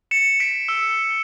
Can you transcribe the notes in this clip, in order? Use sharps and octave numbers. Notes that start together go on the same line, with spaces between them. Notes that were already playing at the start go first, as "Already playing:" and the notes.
C#7 E7
B6 D7
E6